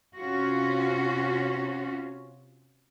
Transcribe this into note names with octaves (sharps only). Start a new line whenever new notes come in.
C3 C#4 F4 F#4